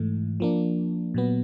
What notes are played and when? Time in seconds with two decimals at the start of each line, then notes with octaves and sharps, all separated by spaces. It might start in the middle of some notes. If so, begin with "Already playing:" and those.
Already playing: G#2 E3 A3
0.40 F3 A#3 D4
1.14 A#2 F#3 B3